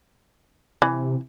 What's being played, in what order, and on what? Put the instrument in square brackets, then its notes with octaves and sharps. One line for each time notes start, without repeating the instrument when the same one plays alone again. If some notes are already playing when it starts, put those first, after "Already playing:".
[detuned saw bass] C3 [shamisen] E3